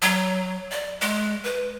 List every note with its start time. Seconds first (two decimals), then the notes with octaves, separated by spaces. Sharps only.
0.02 F#3
0.71 D5
1.01 G#3
1.44 B4